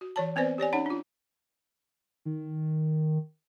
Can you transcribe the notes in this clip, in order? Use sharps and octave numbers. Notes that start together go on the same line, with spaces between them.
F#4
E3 C#5 A5
B3 C4 B4 C5 D5
G4 C#5 D5 G#5
C#4 D#4 C#5 F#5
D4 F4
D#3